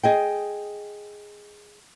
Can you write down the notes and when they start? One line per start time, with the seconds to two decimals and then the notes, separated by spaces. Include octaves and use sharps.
0.03 G#4 D#5 G5